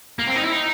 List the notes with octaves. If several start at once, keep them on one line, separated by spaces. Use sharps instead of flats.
A#3
C4
D#4
E4
D#4